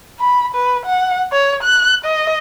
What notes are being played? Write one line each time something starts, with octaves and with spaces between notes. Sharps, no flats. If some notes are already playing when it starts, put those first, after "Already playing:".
B5
B4
F#5
C#5
F#6
D#5